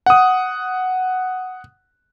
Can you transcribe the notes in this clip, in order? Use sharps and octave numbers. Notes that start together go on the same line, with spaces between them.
F#5 D#6